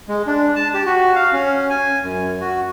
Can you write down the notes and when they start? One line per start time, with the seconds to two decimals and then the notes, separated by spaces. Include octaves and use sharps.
0.08 G#3
0.27 D4
0.56 A5
0.74 G4
0.86 F#4
1.15 F5
1.33 C#4
1.70 G#5
2.03 F#2
2.41 F#4